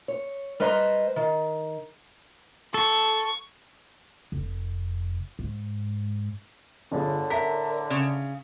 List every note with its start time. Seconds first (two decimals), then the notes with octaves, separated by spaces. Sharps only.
0.08 C#5
0.60 G3 B4 C5 D#5 A#5
1.16 D#3
2.74 A4 C#6
4.32 F1
5.39 G#2
6.92 G1 A2 D3 G#4
7.30 A#4 E5 B6
7.90 C#3